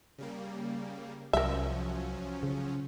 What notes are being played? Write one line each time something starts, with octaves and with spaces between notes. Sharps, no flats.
C#3 G3 A#3
C2 F3 F#3 C#4 A#4 E5
C#3